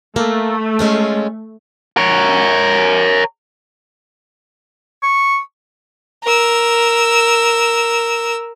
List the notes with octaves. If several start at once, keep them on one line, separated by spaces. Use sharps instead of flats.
A3 A#3
G#3 C#4 F4
A#4 C#5
C#6
A#4 E6